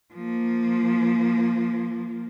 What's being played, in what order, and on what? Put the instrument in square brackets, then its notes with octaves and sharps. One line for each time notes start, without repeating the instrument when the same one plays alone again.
[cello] F3 A#3